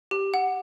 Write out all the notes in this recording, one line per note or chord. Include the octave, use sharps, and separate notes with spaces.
G4
F#5